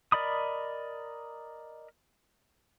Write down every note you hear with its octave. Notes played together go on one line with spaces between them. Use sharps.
A#4 D5 D#5 B5 D#6